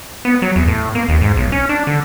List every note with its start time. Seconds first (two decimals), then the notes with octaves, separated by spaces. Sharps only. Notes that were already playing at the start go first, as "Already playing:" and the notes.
0.25 B3
0.42 F#3
0.56 E2
0.68 A2
0.95 A#3
1.09 D#2
1.21 G#2
1.37 B1
1.52 C#4
1.69 D4
1.87 D3